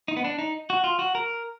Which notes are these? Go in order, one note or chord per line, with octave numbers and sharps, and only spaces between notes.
D#4
B3
D4
D#4
F#4
F4
F#4
A#4